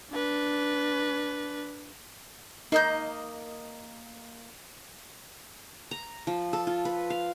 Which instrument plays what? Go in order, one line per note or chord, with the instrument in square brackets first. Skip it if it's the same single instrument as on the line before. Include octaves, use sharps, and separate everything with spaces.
[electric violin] D4 B4
[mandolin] A#3 D#5 G6 [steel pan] D#4
[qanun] A#5
F3
A4
F4
B4
F5